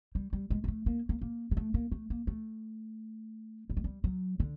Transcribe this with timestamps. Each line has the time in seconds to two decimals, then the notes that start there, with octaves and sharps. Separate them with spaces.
0.15 G3
0.33 G3
0.50 G#3
0.64 A#3
0.68 A3
0.86 A#3
1.09 A#3
1.21 A#3
1.51 G#3
1.57 A3
1.74 A#3
1.92 A3
2.10 A#3
2.27 A3
3.70 G3
3.77 G#3
3.84 G3
4.04 F#3
4.40 D3